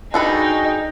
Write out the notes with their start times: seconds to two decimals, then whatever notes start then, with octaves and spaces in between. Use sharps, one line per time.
0.14 D4 D#4 F#4 G#4 A4 B4 G5